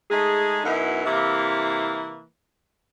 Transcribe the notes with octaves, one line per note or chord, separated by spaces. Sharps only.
G#3 A3 D#4 G#4
F#2 B2 B3 D#4 E4
C3 E3 A#3 E4